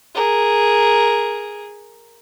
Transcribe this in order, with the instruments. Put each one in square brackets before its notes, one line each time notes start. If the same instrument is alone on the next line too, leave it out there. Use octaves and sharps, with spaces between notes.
[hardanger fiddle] G#4 A#4